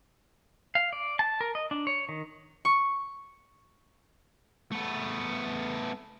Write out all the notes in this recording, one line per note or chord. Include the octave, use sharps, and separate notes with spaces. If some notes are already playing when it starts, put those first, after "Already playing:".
F5
D5
A5
A#4
D#5
D4
C#5
D#3
C#6
A3 B3